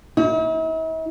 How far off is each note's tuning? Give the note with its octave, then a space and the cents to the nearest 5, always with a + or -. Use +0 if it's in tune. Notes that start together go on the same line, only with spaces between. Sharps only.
E4 -45